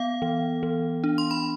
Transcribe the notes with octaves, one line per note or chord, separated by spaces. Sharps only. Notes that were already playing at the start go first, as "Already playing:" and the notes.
Already playing: B3 F5
E3
E3
D4
C6
B5